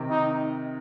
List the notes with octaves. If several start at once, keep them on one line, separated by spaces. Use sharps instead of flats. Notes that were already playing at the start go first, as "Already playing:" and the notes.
Already playing: C3 D#3
D#4